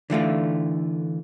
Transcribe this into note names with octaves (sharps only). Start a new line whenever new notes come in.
D3 E3 A3 F4